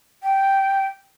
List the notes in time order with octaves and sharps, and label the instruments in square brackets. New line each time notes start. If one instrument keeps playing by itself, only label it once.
[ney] G5